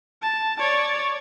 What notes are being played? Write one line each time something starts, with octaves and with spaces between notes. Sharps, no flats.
A5
C#5 D5